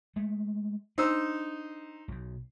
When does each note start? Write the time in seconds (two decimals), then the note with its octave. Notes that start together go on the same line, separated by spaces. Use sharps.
0.16 G#3 A3
0.98 D4 D#4 C5 E6
2.08 B1 B2